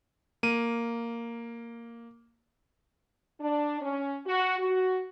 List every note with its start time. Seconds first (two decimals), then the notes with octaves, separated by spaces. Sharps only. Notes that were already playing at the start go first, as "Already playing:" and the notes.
0.43 A#3 D#7
3.40 D4
3.81 C#4
4.26 F#4
4.58 F#4